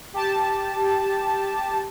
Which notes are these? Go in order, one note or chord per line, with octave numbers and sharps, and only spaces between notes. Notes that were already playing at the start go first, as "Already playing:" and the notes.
G4 A5